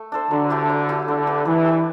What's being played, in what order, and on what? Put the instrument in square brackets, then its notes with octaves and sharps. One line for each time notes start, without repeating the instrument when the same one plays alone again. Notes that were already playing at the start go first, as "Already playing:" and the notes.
Already playing: [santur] A3
D4 A4 C5
[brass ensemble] D3 [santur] F#3
[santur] A3 E4 G4
F#3
A3 E4 G4
[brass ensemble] D3 [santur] D4
[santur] G4 B4
[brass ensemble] E3 [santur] D4
[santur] G4 B4